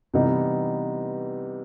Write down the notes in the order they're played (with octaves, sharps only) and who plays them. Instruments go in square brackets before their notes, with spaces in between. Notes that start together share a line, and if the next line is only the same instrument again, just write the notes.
[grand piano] C3 E3 G3 B3 D#4